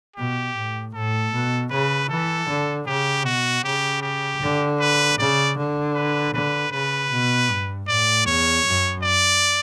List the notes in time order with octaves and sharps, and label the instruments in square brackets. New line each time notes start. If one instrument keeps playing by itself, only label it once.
[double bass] B2 [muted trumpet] G4
[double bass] A2
[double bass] A2 [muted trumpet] A4
[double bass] B2
[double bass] C#3 [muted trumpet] B4
[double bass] E3 [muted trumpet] A4
[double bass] D3
[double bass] C#3 [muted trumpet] G4
[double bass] B2 [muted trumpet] F#4
[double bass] C#3 [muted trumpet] G4
[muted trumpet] G4
[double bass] D3
[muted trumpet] B4
[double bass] C#3 [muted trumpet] D5
[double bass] D3
[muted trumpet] B4
[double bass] D3 [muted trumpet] B4
[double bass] C#3 [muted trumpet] B4
[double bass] B2
G2
[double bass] A2 [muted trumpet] D5
[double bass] E2 [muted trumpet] C#5
[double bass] F#2
[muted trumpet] D5